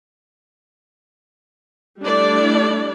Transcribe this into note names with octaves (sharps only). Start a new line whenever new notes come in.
G3 A3 D4 E4 D5